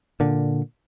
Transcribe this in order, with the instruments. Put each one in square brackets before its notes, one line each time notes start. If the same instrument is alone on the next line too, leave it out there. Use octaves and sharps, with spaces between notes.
[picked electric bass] A#2 D3